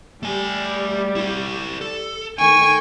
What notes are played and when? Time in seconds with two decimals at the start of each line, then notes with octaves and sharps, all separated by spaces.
0.23 G3 A3 G#5
1.16 E4 G4
1.81 A4
2.38 D#3 A3 G5 G#5 C#6